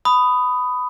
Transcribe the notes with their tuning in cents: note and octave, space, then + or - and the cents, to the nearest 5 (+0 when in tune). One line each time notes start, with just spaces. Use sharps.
B5 +15 D#6 +0